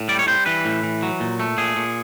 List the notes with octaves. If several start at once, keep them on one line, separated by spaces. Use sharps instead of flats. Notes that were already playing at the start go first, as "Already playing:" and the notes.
Already playing: A2
G3 D5
C#5
G3 C5
E3 B4
A2
E3
F#3
A#2
A3
A#2 G#4
A#2